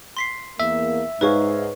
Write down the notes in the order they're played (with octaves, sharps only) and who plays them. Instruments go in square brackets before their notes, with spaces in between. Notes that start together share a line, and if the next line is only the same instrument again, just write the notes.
[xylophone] C6 B6 C7
[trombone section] E2 A#3 [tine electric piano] E5
[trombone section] G#2 [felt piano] D#4 G#4 F5 [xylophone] B4 C#5 C#6